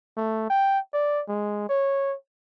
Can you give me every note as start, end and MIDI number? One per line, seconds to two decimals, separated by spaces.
0.17 0.45 57
0.50 0.79 79
0.93 1.23 74
1.28 1.68 56
1.69 2.15 73